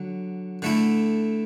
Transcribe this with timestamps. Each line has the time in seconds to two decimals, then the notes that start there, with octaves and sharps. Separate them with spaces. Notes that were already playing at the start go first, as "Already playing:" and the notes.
Already playing: D3 F#3
0.62 D3 A3 E4